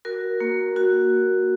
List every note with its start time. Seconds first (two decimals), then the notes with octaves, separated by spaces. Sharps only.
0.05 F#4 A#4
0.41 A#3
0.76 F#4